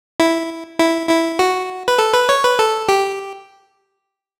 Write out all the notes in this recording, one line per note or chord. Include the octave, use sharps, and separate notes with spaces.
E4
E4
E4
F#4
B4
A4
B4
C#5
B4
A4
G4